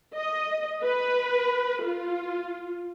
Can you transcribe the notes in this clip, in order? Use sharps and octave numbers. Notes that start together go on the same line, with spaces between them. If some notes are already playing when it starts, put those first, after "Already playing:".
D#5
B4
F4